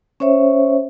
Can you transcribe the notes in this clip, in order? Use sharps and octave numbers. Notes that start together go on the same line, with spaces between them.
C#4 C5 C#5 E5